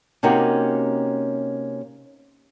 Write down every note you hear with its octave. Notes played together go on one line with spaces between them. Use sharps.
C3 A#3 C#4 D#4 F#4 G4